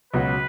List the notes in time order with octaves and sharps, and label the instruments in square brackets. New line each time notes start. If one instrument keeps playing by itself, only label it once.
[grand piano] C#2 B2 F#3 C#4 F#4 [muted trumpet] B4